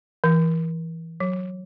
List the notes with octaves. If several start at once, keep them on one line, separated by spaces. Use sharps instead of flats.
E3
F#3